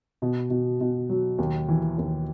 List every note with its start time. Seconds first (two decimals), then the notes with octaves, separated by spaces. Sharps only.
0.22 B2
0.50 B2
0.81 B2
1.10 F#3
1.38 D#2
1.69 E3
1.98 D#2